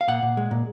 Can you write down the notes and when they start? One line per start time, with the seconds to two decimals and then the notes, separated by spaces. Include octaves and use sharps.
0.01 F5
0.08 A#2 F#5
0.22 A#2
0.37 G#3
0.51 A#2